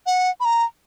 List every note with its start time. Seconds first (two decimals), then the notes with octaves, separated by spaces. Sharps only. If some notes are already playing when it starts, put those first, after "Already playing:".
0.06 F#5
0.40 B5
0.45 A#5